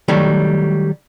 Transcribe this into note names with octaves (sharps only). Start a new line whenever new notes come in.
D#3 F#3 G3 A3